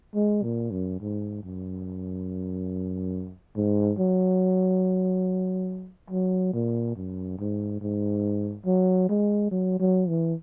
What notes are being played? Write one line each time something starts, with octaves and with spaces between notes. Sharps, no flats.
G#3
A#2
F#2
G#2
F#2
G#2
F#3
F#3
A#2
F#2
G#2
G#2
F#3
G#3
F#3
F#3
E3